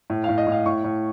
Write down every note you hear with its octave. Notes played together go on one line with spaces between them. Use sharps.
A2
F5
A2
D#5
A2
F5
A2 C#6
A2